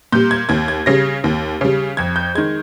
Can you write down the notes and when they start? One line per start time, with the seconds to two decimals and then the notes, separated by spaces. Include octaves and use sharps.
0.12 A#2 G3 G6
0.31 G#6
0.49 D#2 G#6
0.68 G#6
0.86 C#3 G3 A#6
1.24 D#2
1.61 C#3 G3
1.97 F2 G#6
2.16 G6
2.35 D#3 G#3 G#6